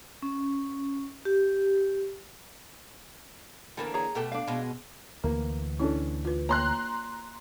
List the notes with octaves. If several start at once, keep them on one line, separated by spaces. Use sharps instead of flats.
C#4
G4
D3 E3 A#3 A4
G#4 C#5 A#5
B2 A3 G4
D4 F5
B2 G#3
D2 E3 A#3
C#4 D4 E4 A4
F4 B4
A#3 C#5 A#5 C6 F#6